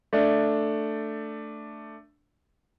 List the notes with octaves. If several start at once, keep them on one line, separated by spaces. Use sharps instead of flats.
A3 D4